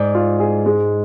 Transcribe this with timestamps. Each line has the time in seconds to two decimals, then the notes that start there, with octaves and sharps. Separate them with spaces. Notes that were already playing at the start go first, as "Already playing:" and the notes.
Already playing: G#2 D5
0.15 F4
0.40 G#4
0.66 G#3